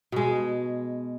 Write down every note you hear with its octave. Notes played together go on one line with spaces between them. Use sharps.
B2 G#3